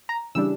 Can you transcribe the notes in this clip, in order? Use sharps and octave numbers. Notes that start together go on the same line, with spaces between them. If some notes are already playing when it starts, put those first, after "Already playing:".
A#5
C#3 E3 G3 D4 E6